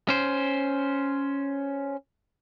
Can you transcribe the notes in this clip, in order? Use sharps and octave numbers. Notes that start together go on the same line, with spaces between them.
C#4 C5